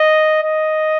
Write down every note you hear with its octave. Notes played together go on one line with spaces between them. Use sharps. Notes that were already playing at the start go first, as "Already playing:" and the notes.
Already playing: D#5
D#5